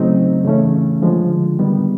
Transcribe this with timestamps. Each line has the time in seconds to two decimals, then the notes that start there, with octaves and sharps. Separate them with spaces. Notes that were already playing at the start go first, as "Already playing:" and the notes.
Already playing: C#3 F#3 A3 C4 D#4
0.45 C#3 E3 A3 C#4
1.02 D3 F3 G#3
1.59 D#3 G3 B3